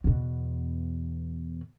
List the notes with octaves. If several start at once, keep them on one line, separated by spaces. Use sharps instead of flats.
E2 B2